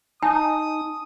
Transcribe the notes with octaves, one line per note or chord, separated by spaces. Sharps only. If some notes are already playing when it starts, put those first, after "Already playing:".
D#4 G#5 A5 D#6